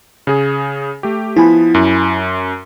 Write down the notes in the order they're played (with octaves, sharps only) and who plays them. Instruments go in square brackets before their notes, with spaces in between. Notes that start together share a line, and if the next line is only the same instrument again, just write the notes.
[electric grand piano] C#3 G#4
A3 G4
[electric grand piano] F3 B3 [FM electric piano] E4 G#5 B5
[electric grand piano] F#2